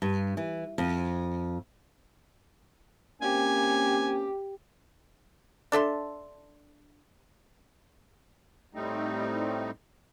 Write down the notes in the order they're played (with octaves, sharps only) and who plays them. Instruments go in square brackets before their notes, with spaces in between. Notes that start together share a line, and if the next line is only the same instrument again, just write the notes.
[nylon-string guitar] G2
E3
F2
[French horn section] A#3 C4 C#4 [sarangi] G4 [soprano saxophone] G#5
[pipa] D4 A4 E5 C6
[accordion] A2 G3 A3 C4 D#4